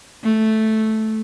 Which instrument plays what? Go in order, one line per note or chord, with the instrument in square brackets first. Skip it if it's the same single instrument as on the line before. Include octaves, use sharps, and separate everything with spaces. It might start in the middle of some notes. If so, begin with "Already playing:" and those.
[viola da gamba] A3